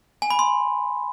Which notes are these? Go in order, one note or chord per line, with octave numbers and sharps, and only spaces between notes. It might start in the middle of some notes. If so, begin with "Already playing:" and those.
G#5
B5
C6